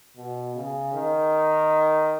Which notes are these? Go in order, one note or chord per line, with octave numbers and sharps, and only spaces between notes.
B2
C#3
D#3